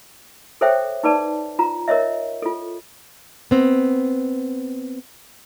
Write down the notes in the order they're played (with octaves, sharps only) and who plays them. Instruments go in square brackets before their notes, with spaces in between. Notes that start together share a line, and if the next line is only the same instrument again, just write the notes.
[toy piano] G#4 A4 C5 C#5 E5 G5
D#4 G#4 B4 D5 A5
F4 A#5
A#4 C#5 D#5 E5
F4 A4
[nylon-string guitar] B3 C4